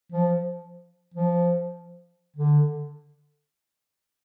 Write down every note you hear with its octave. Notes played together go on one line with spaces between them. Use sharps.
F3
F3
D3